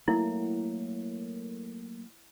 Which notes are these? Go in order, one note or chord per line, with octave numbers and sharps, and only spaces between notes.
F#3 A3 A#3 E4